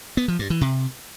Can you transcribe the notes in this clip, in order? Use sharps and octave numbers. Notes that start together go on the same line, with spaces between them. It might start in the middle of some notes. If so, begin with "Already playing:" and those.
B3
F3
G2
E3
C3